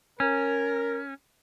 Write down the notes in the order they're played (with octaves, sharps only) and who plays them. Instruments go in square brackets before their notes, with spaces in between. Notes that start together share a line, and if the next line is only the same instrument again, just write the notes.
[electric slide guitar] C#4 [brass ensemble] A#4